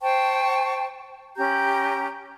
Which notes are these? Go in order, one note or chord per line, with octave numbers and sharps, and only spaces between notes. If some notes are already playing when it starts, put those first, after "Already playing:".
C5 G5 A5 C#6
C#4 G4 A#5 G6